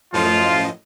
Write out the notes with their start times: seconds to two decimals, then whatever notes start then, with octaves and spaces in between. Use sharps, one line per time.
0.14 F#2 A2 F3 F4 D#5